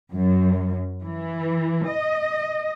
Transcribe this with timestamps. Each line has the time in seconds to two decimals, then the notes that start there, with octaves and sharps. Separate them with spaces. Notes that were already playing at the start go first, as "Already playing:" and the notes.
0.12 F#2
1.03 E3
1.88 D#5